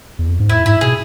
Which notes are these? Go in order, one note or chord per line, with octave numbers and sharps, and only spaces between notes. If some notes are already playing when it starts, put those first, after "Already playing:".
E2
F2
G#2
A2 E4
G#2 E4
B2 G#4